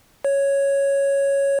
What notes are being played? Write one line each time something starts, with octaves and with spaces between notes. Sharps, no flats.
C#5